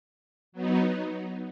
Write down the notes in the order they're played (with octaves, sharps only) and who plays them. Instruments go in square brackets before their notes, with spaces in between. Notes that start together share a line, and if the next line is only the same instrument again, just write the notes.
[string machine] F#3 B3 D#4